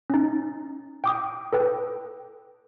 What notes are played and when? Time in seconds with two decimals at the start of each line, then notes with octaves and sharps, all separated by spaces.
0.10 C#4 D#4
1.04 G5 D6 D#6
1.53 A4 B4 G5